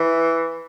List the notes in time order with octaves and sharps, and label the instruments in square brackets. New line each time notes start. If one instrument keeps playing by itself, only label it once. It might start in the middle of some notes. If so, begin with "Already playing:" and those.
Already playing: [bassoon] E3